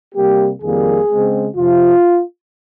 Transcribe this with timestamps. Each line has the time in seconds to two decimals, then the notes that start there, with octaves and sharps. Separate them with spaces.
0.15 C3 G3 A#3 G4
0.62 F2 D#3 G3 A#3 G#4
1.09 C#3 G#3 C4
1.56 F2 C3 F3 F4